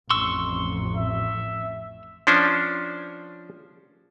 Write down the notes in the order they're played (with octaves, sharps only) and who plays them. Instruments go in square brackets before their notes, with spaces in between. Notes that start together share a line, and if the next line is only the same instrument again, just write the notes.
[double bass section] A1 F2 [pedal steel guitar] C6 C#6 E6
[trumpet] E5
[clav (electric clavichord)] F3 C#4 D4 C5